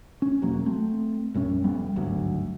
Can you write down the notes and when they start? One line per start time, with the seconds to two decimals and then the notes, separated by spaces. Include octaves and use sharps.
0.22 C#4
0.42 E1 E2 F#3 A#3
0.66 A3 C4
1.34 A#1 F#2 G3 C#4
1.64 F1 G3 B3
1.96 G#1 D2 G2 F#3